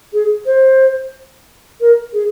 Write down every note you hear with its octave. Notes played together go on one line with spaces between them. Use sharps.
G#4
C5
A#4
G#4